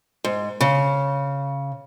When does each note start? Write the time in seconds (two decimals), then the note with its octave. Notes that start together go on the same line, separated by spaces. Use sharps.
0.24 G#2
0.61 C#3